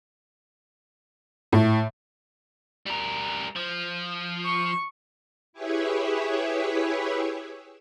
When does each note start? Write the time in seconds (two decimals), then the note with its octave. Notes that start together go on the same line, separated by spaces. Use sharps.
1.53 A2
2.86 G3 A#4
3.56 F3
4.44 C#6
5.53 E4 G4 G#4 B4 C#5 E5